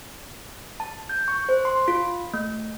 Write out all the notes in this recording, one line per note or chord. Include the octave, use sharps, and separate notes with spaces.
A5
G6
C#6
C5
C6
F4
A3